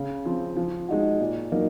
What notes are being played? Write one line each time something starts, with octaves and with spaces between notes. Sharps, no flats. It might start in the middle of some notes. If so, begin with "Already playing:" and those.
Already playing: C#3
F3 C4
F3
G#3 D#4 F#4
A#2
F#3 A#3 D#4